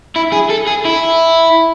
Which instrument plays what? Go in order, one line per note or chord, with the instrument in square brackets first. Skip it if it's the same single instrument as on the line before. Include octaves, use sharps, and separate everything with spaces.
[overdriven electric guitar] E4
G#4
A4
G#4
E4